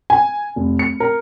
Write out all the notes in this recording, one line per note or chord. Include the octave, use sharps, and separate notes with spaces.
G#5
F1
C#7
A#4